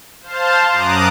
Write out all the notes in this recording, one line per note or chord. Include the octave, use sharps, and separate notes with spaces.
C5 F5 A5
F#2 A#5 D6 D#6 F#6